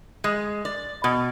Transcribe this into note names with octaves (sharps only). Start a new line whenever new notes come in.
G#3
D5
B2